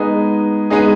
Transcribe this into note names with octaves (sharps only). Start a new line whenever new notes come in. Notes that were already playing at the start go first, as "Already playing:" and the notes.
Already playing: G#3 B3 D#4 G#4
G#3 B3 D#4 G#4